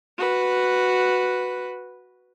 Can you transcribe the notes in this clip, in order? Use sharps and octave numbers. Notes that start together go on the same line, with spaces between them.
F#4 B4